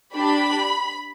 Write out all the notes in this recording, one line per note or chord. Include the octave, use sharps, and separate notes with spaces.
D4 G4 B5